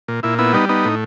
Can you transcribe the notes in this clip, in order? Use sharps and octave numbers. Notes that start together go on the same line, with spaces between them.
A#2
A#2 E4
B3 E4
G3 D#4
B3 D#4
A2